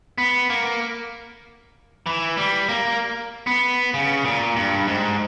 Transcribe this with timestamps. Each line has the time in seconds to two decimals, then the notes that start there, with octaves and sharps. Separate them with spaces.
0.18 B3
0.50 A#3
2.06 E3
2.37 G3
2.69 A#3
3.47 B3
3.94 C#3
4.25 A#2
4.56 G2
4.88 G#2